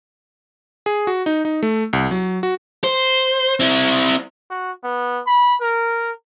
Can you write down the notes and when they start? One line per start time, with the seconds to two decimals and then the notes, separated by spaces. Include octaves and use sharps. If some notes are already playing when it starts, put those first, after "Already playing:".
0.86 G#4
1.07 F#4
1.26 D#4
1.45 D#4
1.63 A3
1.93 C2
2.11 F#3
2.43 F#4
2.84 C5
3.60 C4 E4
4.50 F#4
4.84 B3
5.27 B5
5.61 A#4